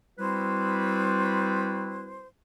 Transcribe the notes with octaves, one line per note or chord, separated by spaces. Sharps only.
G3 C4 E4 F#4 B4 C5